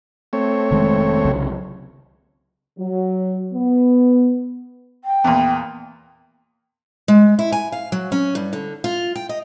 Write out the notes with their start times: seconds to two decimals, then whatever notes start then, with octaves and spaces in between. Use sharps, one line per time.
0.33 A3 C4 C#5
0.71 F1 D#3 G#3
1.25 C2 C#3 F#3
2.79 F#3
3.53 B3
5.04 G5
5.24 E2 A#2
7.08 G#3
7.39 E4
7.52 G#5
7.72 F5
7.92 F#3
8.12 C#4
8.35 G2
8.53 D3
8.84 F4
9.16 G5
9.29 D#5